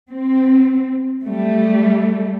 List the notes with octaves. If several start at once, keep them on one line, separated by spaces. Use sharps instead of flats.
C4
G3 A3